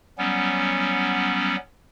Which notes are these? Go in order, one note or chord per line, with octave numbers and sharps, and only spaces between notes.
F#3 G3 B3 C#4